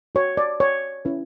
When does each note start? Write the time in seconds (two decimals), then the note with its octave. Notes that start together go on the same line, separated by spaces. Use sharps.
0.15 F#4 C#5
0.37 D5
0.60 C#5
1.05 C#4 E4 B4